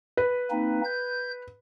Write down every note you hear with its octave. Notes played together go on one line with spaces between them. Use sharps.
B4
A#3 C4 D#4
G6